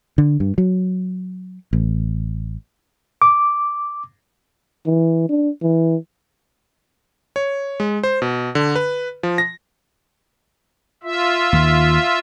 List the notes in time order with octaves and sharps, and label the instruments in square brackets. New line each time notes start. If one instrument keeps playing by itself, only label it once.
[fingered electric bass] D3
G2
F#3
A1
[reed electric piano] D6
[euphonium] E3
D4
E3
[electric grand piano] C#5
G#3
C5
B2
D3
B4
F3
A#6
[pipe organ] F4 E5
[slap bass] D#2 D#3